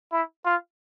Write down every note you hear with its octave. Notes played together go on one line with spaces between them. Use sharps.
E4
F4